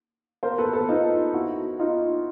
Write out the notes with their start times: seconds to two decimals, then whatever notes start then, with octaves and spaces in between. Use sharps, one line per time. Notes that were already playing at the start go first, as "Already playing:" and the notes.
0.43 A#4 C5
0.58 A4 B4
0.73 A4 B4
0.89 D#4 F4
1.34 E4 F#4
1.79 D#4 F4